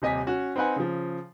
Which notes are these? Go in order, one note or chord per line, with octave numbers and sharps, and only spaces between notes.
D#1 C3 D#5 G#5 B6
C#4 F#4
C4 D#4 B4 F#5 G#5
C#3 F3